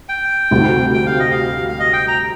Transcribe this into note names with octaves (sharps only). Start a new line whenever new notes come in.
G5
D2 C3 G3
G5
F5
D#5
F5
F5
D#5
G5
A#5